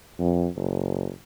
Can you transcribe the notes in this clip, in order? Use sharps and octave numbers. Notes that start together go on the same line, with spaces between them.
F2
F#1